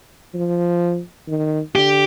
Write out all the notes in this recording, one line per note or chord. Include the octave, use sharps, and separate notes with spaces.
F3
D#3
D3 G4